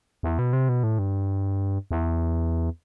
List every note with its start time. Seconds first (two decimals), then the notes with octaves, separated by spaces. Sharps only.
0.23 E2
0.39 B2
0.53 C3
0.69 B2
0.83 A2
0.99 G2
1.91 E2